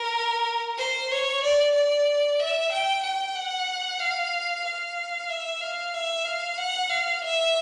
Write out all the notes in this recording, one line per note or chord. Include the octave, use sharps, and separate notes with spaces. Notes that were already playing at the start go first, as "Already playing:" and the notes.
Already playing: A#4
C5
C#5
D5
D5
E5
G5
G5
F#5
F5
F5
E5
F5
E5
F5
F#5
F5
E5